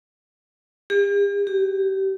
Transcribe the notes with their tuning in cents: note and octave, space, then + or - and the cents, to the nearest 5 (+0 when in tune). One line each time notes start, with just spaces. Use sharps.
G4 +45
G4 -30